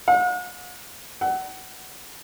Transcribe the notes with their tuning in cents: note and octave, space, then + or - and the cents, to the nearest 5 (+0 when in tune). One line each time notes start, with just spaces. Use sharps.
F#5 -45
F#5 +25